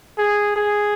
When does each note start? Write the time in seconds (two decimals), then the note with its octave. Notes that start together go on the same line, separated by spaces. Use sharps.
0.18 G#4
0.56 G#4